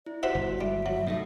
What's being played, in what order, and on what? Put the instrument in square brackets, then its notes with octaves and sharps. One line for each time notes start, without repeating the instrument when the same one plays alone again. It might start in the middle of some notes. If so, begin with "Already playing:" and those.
[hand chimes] E4 [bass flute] D5
[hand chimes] F#4 B6 [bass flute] G4 [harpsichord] C5 E5 F#5
[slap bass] G1 [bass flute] D3
[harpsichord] G3 [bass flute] E5
[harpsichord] F#3
[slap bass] A2 [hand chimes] A3 D#4 A4